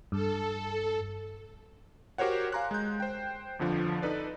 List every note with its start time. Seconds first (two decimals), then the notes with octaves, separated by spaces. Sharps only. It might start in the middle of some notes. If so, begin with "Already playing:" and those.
0.12 G2 A4
2.18 F#4 G4 A#4 C5 C#5 F#5
2.52 F5 G#5 A#5 C6 F#6
2.71 G#3 G6
3.00 C5 G5
3.59 G1 F2 D3 F3
4.02 D#4 A4 B4 D5